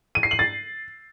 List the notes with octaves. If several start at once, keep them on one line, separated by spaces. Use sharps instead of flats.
D#7
C7
F#7
A6